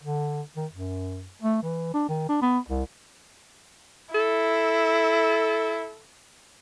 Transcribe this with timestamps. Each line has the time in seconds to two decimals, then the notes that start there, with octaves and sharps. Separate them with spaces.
0.03 D3
0.56 D#3
0.71 F#2
1.42 A3
1.63 E3
1.94 D4
2.09 D#3
2.29 D4
2.42 B3
2.69 C2
4.14 E4 A4